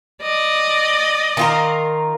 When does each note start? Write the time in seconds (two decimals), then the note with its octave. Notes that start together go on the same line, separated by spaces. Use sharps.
0.22 D5 D#5
1.37 D#3 F4 A#4